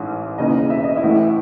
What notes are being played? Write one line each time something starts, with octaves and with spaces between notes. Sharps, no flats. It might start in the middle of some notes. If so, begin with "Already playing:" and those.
Already playing: A1 G#2 E3
E1 D#2 C#3 E3 D#4 D#5
E5
D#5
E4 E5
A1 A2 E3